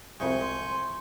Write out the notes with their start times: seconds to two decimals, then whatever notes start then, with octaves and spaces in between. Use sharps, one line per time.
0.20 C2 F2 G#3 E5 G#5 C#6 G6
0.41 C6